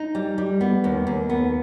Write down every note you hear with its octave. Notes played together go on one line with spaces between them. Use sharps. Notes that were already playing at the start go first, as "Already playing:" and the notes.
Already playing: D#4
G3
G3
B3
D#2
D#2
B3